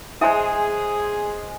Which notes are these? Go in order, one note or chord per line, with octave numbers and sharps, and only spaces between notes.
G#3 E4 G#4 C5 E5 G#5 D#6